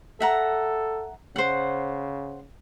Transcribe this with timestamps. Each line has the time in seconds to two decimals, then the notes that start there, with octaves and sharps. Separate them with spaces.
0.20 A4 E5 F#5 A#5
1.36 C#3 C5 F#5